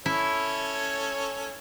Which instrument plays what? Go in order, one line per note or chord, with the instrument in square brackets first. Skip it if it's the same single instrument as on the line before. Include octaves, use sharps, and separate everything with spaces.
[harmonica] C#4 A4 C#5 [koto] E4